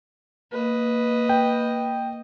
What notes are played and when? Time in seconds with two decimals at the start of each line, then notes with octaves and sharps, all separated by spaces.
0.52 A#3 B4 D#5
1.29 G5